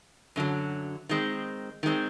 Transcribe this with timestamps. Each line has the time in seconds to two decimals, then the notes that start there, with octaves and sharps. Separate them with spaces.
0.36 F#2 D3 F#3
1.09 D#3 G#3 C4
1.83 D#3 G#3 C4